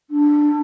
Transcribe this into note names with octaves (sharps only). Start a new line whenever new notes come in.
D4